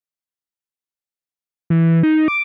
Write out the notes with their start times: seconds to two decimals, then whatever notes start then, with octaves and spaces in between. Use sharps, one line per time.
1.70 E3
2.03 D#4
2.28 D6